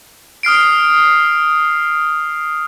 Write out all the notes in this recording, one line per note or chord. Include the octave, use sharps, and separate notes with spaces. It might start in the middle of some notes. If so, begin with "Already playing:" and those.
D#6 F6 C7 D7